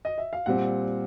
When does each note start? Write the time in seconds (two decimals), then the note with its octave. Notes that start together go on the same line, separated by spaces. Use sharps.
0.05 D#5
0.18 E5
0.33 F5
0.46 A#2 G3 C4 F#5